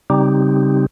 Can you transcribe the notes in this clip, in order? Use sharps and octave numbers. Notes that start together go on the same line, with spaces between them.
C#3 G3 C4 D#4 G4